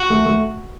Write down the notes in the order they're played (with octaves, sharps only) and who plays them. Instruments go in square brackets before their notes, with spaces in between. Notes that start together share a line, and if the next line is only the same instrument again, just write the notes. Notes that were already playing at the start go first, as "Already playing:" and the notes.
Already playing: [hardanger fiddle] F#4
[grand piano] A3
A3